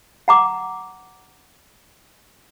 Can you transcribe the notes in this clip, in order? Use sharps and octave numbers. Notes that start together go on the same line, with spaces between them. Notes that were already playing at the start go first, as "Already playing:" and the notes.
F#5 A#5 D6